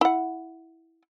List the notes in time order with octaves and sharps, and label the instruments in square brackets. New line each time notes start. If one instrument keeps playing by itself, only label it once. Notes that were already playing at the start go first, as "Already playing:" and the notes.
[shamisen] E4 F#5